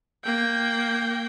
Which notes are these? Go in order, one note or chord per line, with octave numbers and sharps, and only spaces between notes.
A#3 G5